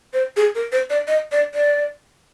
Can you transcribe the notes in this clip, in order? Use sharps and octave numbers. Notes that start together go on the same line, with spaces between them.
C5
G#4
A#4
C5
D5
D#5
D5
D5